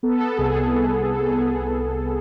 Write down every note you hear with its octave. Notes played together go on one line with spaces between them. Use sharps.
B3 A4
B3 A4
C2 G#4
C2
B3
C2
C2 A4
B3 G#4
C2 G#4
C2
C2
B3